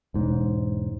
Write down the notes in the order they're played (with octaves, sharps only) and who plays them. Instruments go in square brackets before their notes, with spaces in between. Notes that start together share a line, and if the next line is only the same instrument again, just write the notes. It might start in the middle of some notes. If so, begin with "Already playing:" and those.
[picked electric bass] E1 G#2